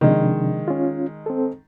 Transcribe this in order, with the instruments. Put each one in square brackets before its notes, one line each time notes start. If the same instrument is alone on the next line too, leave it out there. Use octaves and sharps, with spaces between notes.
[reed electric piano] C3 F3 D4 [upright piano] D#3 G#3
[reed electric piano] C#4 F4
C4 A4